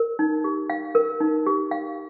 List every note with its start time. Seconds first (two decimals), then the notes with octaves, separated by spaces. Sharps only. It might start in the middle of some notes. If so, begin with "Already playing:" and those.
Already playing: A#4
0.19 D#4
0.44 G4
0.70 F5
0.95 A#4
1.20 D#4
1.47 G4
1.71 F5